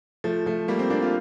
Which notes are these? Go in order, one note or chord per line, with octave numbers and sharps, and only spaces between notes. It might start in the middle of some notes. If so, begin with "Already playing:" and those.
F3 A3
F3 A3
G3 A#3
C4
A#3 D4
F4